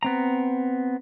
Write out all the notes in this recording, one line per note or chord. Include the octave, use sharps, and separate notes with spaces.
B3 C4 A#5